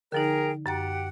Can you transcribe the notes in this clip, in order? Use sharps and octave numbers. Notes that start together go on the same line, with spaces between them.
D3 F3 D#4 G#4 A#4 G5
F#2 G4 F#5 G5 A#5 A6